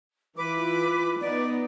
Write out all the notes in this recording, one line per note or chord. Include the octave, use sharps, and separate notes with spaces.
E3 F4 B4 D6
B3 D#4 D5